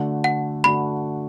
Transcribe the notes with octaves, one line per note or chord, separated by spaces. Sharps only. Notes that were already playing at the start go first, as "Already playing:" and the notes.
Already playing: D3 A3 D4 F#4
F#5
D3 A3 D4 F#4 B5